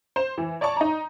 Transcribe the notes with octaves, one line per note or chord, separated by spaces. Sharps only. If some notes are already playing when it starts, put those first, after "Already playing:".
C5 E7
E3
C#5 D5 A5 C#6
D#4 A#5